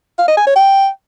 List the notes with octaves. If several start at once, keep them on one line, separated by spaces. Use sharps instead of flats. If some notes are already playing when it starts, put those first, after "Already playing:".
F5
D#5
G#5
C#5
G5